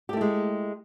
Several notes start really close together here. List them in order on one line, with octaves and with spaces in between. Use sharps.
G4 A3 E4 G#3